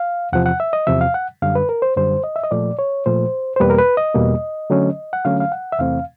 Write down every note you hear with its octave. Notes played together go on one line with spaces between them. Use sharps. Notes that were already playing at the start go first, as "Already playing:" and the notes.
Already playing: F5
E2 C3 F3 F#5
F#5
E5
D#5
E2 C3 F3 E5
F5
F#5
F#2 D3 G3 F5
B4
A#4
C5
F#2 D3 G3 C5
D#5
E5
D#5
A#2 F3 A3 D5
C#5
A#2 F3 A3 C5
C5
E2 B2 G3 A#3 B4
A#4
B4
D#5
E2 B2 G3 A#3
D3 F#3 A3 C#4
F#5
D3 F#3 A3 C#4 F5
F5
F#5
E5
E2 C3 E3 A3 C4 F5